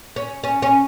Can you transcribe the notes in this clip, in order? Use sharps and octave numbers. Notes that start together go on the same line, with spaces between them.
C#4
C#4
C#4